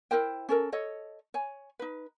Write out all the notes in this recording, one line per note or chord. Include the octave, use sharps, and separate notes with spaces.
E4 A#4 C5 G5
C#4 A4 A#4
A4 C#5 D#5
C#5 G#5
D#4 B4